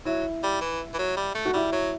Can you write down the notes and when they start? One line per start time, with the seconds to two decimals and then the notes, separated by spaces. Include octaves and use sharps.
0.05 F#3 E4
0.43 G3
0.61 E3
0.94 E3
0.99 F#3
1.17 G3
1.35 A3
1.45 F#4
1.54 G3 E4
1.73 F#3